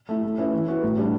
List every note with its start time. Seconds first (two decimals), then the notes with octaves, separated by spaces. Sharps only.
0.09 A3 E4
0.23 A3
0.38 C#4 E4 B4
0.53 E3
0.68 B3 F#4
0.83 A2
0.97 G3 D4